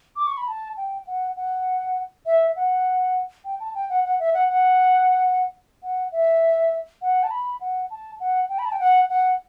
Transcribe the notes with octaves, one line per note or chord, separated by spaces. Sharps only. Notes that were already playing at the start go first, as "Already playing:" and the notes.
D6
C#6
B5
A5
G5
F#5
F#5
E5
F#5
G5
A5
G5
F#5
F#5
E5
F#5
F#5
F#5
E5
F#5
A5
B5
F#5
A5
F#5
G5
B5
A5
G5
F#5
F#5